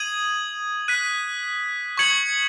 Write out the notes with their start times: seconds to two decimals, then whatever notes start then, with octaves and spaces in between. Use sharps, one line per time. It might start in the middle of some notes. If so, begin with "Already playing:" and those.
Already playing: D#6 G#6 D#7 F#7
0.88 F#6 B6 D#7
1.98 C#6 G#6 C#7 F#7